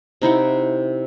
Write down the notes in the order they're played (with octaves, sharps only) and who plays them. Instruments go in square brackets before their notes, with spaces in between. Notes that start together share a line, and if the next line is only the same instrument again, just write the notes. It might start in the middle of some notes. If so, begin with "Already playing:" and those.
[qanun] C3 D#4 E4 F#5